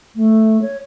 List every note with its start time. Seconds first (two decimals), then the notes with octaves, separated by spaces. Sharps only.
0.16 A3
0.62 C#5